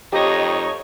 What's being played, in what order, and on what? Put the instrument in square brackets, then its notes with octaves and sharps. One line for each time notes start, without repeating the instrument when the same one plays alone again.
[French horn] F2 [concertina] D#4 [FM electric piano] G4 A#6 [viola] C#5 D#5